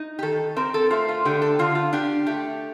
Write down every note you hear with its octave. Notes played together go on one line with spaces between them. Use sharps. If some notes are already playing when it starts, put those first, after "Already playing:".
Already playing: D#4
G4
D#3 A4
C4 A#4
A4
A3 F4
F4
D3 G4
A4
D3 F4
F4
D4 G4
A3 G4